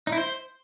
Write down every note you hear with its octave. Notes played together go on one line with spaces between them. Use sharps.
D#4
E4
C5